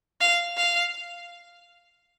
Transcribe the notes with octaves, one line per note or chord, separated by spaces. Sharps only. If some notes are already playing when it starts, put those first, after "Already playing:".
F5
F5